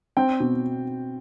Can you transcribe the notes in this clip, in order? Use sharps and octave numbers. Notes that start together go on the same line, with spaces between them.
C4 G5
B2